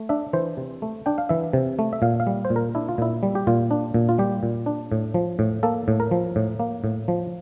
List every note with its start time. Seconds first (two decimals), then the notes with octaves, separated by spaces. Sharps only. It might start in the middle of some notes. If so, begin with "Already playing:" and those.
Already playing: A3
0.09 D4 E5
0.33 E3 C5
0.57 C3
0.82 A3
1.06 D4 G5
1.18 F5
1.29 E3 E5
1.53 C3
1.79 A3
1.93 E5
2.02 A#2 F5
2.20 F5
2.27 G3
2.45 C5
2.50 A#2
2.56 A#4
2.75 D4 E4
2.89 F4
2.98 A#2 E4
3.23 G3
3.35 G4
3.47 A#2 F4
3.71 D4
3.94 A#2
4.09 F4
4.18 G3 G4
4.43 A#2
4.66 D4
4.92 A2
5.14 F3
5.39 A2
5.63 A#3 A4
5.88 A2
6.00 A#4
6.11 F3
6.36 A2
6.60 A#3
6.84 A2
7.08 F3